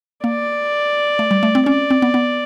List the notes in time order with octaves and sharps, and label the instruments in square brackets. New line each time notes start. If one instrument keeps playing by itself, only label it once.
[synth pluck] A#3 [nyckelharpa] D5
[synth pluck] A3
G3
A3
C4
[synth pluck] C#4 [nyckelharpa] D5
[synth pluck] C4
B3
B3